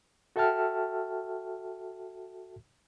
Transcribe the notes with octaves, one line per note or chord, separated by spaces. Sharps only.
F#4 A4 E5 G5 A5 F6